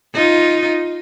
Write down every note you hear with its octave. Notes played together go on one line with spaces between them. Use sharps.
D#4 F4